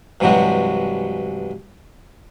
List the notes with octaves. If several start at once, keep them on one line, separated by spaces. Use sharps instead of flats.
G2 C3 E3 F#3 G#3 F#4